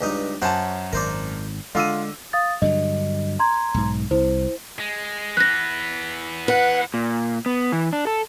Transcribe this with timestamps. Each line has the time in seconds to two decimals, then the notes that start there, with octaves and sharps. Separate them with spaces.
0.01 C#2 G2 D#4
0.42 F#2 F#4 C5 C#5 A5
0.93 G#1 A#4 C5 D5
1.75 D3 G#3 F4 D5 E6 D#7
2.33 F5 D#6 A6
2.62 G2 D3 F#3 D#5
3.39 A#5 C6 G#6
3.74 B1 G#2
4.11 C2 E4 C5
4.80 G#3
5.37 E3 B3 F#6 A#6
6.48 B4 F#5
6.94 A#2
7.46 B3
7.72 E3
7.93 D4
8.07 A4